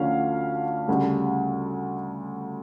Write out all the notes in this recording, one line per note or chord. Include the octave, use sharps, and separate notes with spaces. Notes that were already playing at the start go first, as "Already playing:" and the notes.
Already playing: D2 D3 F3 A3 C#4 F5
D2 C#3 G3